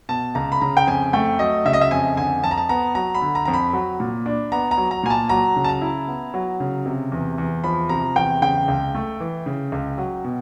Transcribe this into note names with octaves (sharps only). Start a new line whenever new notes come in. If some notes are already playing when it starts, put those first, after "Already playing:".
B2 A5
C#2 A#5
B5
C#3 A#5
G5
F2 G#5
A3 G5
F#3 D#5
C#3 E5
D#5
E5
F2 G#5
D3 G#5
F2 A5
A#5
A5
B3 A#5
F#3 A#5
B5
D3
A#5
F2 A#5
B5
F#3
A#2
D4
B3 A#5
A#5
F#3
A#5
A#2 G#5
A5
F#3 A#5
C#3
A5
A#5
E4
B3
F#3
C#3
C3
E2
E2
F3 B5
C3 A#5
E2 G5
C#3 G5
C#2
A3
E3
C#3
C#2
F#3
B2